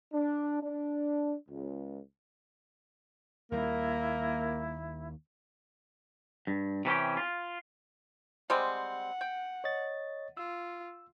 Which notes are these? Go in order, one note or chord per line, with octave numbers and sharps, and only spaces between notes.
D4
D4
C#2
D#2 G3 A#3 E4 A#4
G2
C3 E3 C#4 G4
F4
G3 G#3 C4 F#5
G5
C#5 D#5 A6
F4 E6